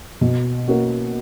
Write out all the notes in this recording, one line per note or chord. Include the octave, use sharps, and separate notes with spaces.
B2
A#3 C#4 F#4 A#4